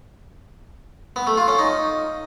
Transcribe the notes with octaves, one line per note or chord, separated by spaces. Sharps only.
B3
A3
F4
C#4
D#4